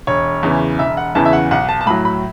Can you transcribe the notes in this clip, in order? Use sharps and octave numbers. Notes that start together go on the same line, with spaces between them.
E1 C#5
E2 C#3 E3
E1 E5
F#5
E2 C#3 E3 A5
E5
F#5
B1 F#5
A5
A5
A2 F#3 B5
B5